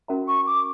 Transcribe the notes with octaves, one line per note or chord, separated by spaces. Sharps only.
C#4 F#4 A#4 E5 A#5
C#6
D6